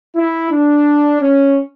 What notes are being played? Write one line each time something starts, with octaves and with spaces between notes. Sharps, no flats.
E4
D4
C#4